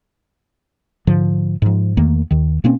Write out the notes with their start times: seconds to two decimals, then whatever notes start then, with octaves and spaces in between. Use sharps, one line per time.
1.07 G#2 D3 F3
1.62 G#2 F3
1.97 E2 D#3 A3 A#3
2.31 D#2 D#3
2.64 B2 A#3 C4 C#4